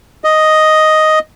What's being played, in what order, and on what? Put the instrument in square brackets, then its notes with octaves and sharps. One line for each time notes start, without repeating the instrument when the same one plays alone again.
[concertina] D#5